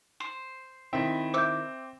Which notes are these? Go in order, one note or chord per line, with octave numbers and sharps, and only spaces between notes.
C5
D#3 C4 E4
C5 E5 D6 E6 G6